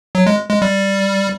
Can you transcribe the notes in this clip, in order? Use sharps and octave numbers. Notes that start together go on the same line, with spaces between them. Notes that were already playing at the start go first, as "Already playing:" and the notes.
F#3
G#3
G#3
G3